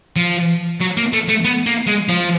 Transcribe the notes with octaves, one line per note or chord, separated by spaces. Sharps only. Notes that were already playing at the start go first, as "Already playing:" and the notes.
F3
F#3
A#3
A3
A3
B3
A#3
G#3
F3